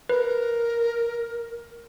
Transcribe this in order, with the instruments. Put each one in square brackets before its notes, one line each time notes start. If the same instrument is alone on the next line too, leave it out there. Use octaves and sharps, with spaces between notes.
[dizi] A#4 [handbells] B4